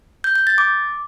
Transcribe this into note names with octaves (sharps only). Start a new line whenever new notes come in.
G6
G6
A6
D6